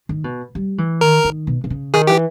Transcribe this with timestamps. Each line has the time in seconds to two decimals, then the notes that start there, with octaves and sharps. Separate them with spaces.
0.09 D#3
0.24 B2
0.55 G3
0.78 E3
1.01 D#3 A#4
1.24 D#3
1.47 B2
1.64 B2
1.70 C#3
1.94 D#3 G#4
2.07 E3 G4